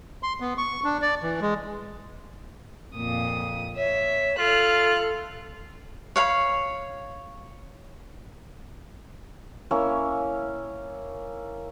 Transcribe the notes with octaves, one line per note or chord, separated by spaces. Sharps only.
C6
B3
C#6
D4
D5
E3
G#3
F2 A#2 D#6
C#5 E5
F4 A4 F6 F#6
C#5 F5 B5
A#3 C#4 E4